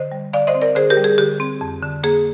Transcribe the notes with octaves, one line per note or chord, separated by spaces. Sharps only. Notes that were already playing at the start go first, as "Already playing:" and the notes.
Already playing: D3 C5 D#5
G3
D3 D5 F5
C5 D#5
C4
A#4 D5
D3 G#4 C5
G4 A#4
G3
G#4
D3 G4
C4
F2
D3
A#3 G#4